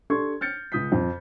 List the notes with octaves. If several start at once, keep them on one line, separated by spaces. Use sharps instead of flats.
D4 G4 A4 C6 C#6 G#6
F6 G6 A6 C#7
C#2 D#6 G6 B6
F2